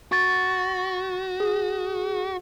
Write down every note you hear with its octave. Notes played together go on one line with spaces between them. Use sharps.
F#4 C#6 A6
G#4